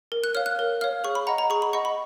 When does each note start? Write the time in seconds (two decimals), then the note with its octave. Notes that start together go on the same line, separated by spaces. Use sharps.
0.12 A#4
0.24 F#6
0.35 C#5 F5 F6
0.46 F#6
0.59 A#4
0.81 C#5 F5 F6
1.04 G#4 C#6
1.15 B5
1.27 D#5 F#5 A#5
1.38 A#5
1.50 G#4 C#6
1.62 B5
1.73 D#5 F#5 C#6
1.85 B5